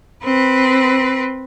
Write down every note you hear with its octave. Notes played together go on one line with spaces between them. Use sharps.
C4 B4